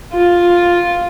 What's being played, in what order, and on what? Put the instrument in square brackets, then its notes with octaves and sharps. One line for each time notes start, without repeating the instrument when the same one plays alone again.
[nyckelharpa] F4